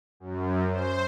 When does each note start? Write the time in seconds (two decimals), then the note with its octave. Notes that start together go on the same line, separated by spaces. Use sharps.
0.20 F#2
0.72 C5